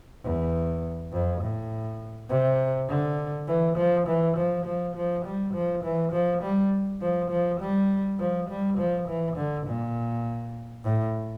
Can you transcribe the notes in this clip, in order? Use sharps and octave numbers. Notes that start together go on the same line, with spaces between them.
E2
F2
A2
C3
D3
E3
F3
E3
F3
F3
F3
G3
F3
E3
F3
G3
F3
F3
G3
F3
G3
F3
E3
D3
A#2
A2